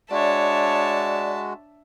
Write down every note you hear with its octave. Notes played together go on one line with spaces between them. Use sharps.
G#3 D4 F#4 C#5 D5 E5 A5